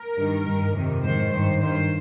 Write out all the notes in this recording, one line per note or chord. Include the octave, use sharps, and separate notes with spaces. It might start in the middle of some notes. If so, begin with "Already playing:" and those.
Already playing: A#4
G2 D#3
G2 D#3
F2 C3 D#3
G#2 D#3 C5
G2 D#3 C5
G2 D#3 C5